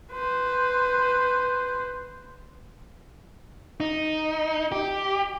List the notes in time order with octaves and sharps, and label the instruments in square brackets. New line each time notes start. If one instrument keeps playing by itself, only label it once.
[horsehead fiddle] B4 C5
[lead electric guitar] D#4
G4